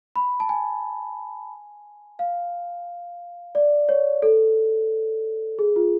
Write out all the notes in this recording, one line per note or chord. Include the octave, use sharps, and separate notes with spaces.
B5
A5
G#5
F5
D5
C#5
A4
G#4
F4